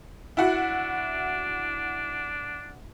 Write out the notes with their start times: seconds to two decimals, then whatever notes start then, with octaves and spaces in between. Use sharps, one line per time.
0.37 D4 E4 F#4 F#5